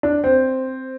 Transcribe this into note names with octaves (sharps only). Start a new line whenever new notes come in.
D4
C4